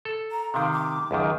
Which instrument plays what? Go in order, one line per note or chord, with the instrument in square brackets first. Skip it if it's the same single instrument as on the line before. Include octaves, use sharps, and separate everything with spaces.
[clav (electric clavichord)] A4
[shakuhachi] A#5
[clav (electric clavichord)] C3 D#3 [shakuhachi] F5
[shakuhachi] D6
[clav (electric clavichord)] C#2 F#2 D#3